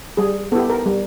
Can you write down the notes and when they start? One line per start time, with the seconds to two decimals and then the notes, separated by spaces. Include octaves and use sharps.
0.17 G3 G#4
0.52 B3 A4
0.55 E4 G4
0.70 A#4
0.86 G3